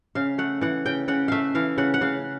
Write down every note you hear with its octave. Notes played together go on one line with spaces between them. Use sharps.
C#3 F5
A3 F#5
E3 F#5
C#3 G5
C#3 F#5
A3 E5 F5
E3 F5
C#3 F#5
F#5
C#3 F5